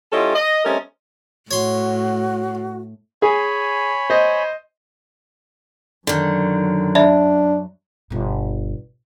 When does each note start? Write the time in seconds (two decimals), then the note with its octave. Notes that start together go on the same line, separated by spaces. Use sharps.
0.12 G3 C#4 E4 F4 A4 D#5
0.35 D#5
0.65 G3 A3 C4 C#4 A#4 D#5
1.51 A2 F#4 C#5 C6
3.22 G#4 C#5 G#5 B5
4.10 C5 D#5
6.07 F#2 D3 D#3 F#3
6.95 D4 D5 E5 B5
8.10 G1 B2